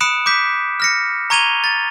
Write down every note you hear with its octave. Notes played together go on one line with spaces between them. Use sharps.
B5 D#6 F#6 C#7 D7 E7
D6 G6 B6
F6 A#6 C#7
A#5 C#6 G#6 D#7 F7 G7
A6